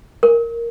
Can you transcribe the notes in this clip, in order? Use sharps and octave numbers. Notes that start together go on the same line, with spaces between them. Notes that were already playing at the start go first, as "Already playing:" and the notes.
A#4